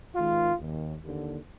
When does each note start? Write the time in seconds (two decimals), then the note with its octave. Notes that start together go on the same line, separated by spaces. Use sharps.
0.15 G#1 G#2 D#3 F4
0.59 D#2 D#3
1.03 D#2 D3